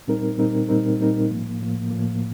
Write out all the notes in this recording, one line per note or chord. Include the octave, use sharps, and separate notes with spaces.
A#2 G3 C4 D#4 A#4
A#2 G3 C4 D#4 A#4
A#2 G3 C4 D#4 A#4
A#2 G3 C4 D#4 A#4
A2 F3 A#3
A2 F3 A#3
A2 F3 A#3